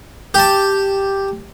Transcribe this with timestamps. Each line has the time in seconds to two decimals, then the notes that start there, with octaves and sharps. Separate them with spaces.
0.34 G4 A5